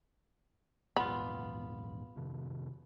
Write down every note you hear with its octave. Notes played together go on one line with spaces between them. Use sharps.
A#1 E2 G#2 B3 F4 B5
F2 C3 D#3